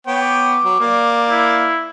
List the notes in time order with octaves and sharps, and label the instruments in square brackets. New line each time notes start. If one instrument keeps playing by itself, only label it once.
[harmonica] B3 C#5 G5
[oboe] D6
[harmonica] F#3
A#3 D5 F5
[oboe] E4